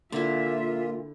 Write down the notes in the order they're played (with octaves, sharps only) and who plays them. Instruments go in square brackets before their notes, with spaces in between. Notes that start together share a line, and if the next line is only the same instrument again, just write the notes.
[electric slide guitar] A#2 [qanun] D3 E4 [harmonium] F4 [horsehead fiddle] E5